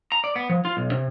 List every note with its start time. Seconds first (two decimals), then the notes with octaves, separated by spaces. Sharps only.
0.12 A#5
0.24 D5
0.36 B3
0.50 F3
0.65 F4
0.77 B1
0.91 C3